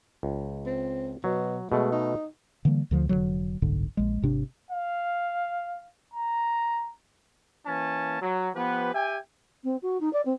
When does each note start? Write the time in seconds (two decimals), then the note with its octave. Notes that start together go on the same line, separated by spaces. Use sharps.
0.23 C#2
0.66 C4
1.24 B2 F#3
1.72 B2 G#3 A3
1.92 D#4
2.65 D3 E3 G3 A#3
2.91 D2 D3 F3
3.09 F1 C#2 D3 F#3
3.62 F#1 C2 G#2 D3
3.97 A#1 G#3
4.22 G#1 C3 D4
4.71 F5
6.14 A#5
7.66 E3 A#3 C#4 A5
8.22 F#3
8.53 F3 B3 G4 B4
8.93 G4 E5 G5 G#5
9.64 C4
9.82 F#4
10.01 D#4
10.13 D5
10.25 C4